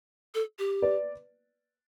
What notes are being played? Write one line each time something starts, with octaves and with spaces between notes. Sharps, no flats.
A4
G4
B4 D5